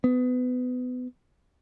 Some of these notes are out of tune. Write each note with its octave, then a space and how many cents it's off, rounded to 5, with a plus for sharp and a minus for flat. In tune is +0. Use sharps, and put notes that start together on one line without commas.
B3 +25